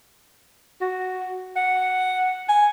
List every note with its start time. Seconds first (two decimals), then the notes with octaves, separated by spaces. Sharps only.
0.81 F#4
1.56 F#5
2.49 G#5